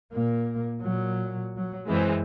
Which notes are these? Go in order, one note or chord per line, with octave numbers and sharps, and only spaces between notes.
A#2 A#3
A#2 F#3
F#3
F#2 E3 G#3 C4